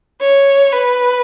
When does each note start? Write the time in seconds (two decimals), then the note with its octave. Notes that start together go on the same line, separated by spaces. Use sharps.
0.21 C#5
0.72 B4